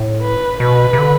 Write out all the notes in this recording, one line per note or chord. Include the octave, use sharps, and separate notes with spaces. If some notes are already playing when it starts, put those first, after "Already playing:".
Already playing: A2
B4
B2 B4
C3
D3